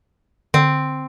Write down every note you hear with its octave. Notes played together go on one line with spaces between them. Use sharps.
D3 C4